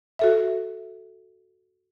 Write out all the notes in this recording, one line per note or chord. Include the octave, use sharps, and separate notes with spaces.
F#4 A4 E5